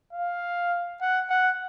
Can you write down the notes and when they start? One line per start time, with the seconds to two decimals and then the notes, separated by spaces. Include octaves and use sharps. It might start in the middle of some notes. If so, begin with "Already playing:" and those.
0.13 F5
1.01 F#5
1.30 F#5